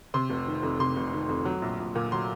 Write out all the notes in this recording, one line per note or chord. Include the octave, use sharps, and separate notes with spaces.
C3 C6
F1
D#3
F2
C3 C6
F1
D#3
F2
F#3
A#1
A#1
A#2
F#3 C6